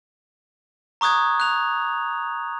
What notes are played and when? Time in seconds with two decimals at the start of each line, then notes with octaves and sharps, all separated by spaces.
1.01 A#5 C#6 D#6 F#6 G#6
1.40 F#6 F7